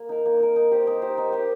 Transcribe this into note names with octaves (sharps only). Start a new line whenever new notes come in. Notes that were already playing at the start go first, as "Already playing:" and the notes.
Already playing: A#3
D#4 A#4
A#3
D#4 A#4
D#4
G4 C5
D#4
G4 C5
D#4
G4 C5